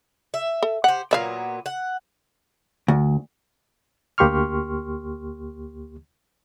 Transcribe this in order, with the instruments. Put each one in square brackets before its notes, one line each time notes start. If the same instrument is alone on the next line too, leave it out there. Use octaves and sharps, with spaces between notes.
[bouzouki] E5
[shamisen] A4
[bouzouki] G4 C5 [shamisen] F#5
[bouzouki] A#2 F#3 B3 [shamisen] D5 E5 F5
[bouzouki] F#5
[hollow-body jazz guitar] D2
[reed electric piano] D2 A#3 G4 C6 C#6 F6